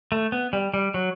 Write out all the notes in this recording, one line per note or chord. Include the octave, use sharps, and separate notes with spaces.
A3
B3
G3
G3
F#3